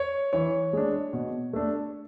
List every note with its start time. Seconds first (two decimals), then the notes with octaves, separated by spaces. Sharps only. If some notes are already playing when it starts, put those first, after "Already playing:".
Already playing: C#5
0.33 E3 C#5
0.73 G#3 D4
1.13 B2
1.53 A3 D4